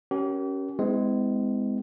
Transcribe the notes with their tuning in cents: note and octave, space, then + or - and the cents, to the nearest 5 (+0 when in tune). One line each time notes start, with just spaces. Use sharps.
C#4 +0 G4 -40 A#4 +15
G#3 +0 C4 -45 E4 -25